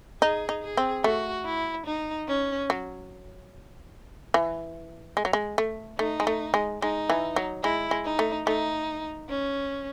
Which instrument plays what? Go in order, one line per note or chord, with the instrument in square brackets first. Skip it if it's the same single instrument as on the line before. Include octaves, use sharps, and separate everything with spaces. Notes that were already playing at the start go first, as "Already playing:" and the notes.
[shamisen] D#4 [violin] G#4
[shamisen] D#4
[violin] G#4
[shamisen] C4
[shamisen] A3 [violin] F#4
[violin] E4
D#4
C#4
[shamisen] F#3
E3
G#3
F#3
G#3
A3
[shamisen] A3 [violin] D#4
[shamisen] G#3
A3
G#3
[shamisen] G#3 [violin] D#4
[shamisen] E3
F#3
[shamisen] G#3 [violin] E4
[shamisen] G#3
[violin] D#4
[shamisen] A3
[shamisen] A3 [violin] D#4
[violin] C#4